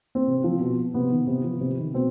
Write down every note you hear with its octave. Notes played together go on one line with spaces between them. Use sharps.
C4
C3
F3
B2
C3 B3
D#3
C3
F3
C3
D#3
B2 C4